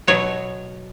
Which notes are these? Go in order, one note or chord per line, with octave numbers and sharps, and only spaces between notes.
B2 F#3 B3 C#5